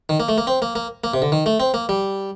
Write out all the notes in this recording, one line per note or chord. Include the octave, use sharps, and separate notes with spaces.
D#3
A#3
A3
A#3
C4
A#3
A#3
A#3
C3
D3
D#3
A3
C4
A#3
G3